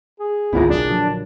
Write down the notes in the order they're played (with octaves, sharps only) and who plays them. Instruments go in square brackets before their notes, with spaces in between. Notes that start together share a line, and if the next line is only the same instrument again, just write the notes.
[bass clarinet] G#4
[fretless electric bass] G#1 B3 C4 [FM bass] D2 [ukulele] E4 F4 A#4
[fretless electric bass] F#1 B1 F#3 [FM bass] D4
[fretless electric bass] A#1 D3 F#3